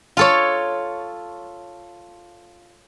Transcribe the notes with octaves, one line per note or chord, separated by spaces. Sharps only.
F4 A4 C#5